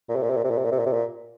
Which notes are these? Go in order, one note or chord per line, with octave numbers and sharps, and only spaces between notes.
A#2
C3
A#2
C3
A#2
C3
A#2
C3
A#2
C3
A#2
C3
A#2